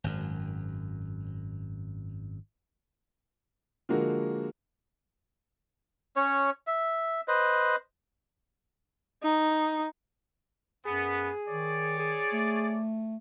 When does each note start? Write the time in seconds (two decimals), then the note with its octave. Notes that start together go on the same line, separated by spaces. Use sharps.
0.04 G#1 F#2
3.89 D3 F3 G#3 A#3 F#4 A#4
6.16 C#4 C#5
6.67 E5
7.28 B4 C5 D#5
9.23 D#4
10.86 F#2 B3 G#4
11.48 D#3 C#5 D5
11.99 G#4
12.33 A3